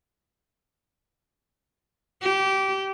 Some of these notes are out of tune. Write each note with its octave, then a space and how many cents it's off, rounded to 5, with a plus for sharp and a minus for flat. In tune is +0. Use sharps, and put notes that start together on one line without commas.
G4 -20